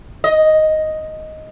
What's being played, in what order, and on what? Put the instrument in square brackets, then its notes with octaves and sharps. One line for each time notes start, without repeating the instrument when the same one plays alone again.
[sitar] D#5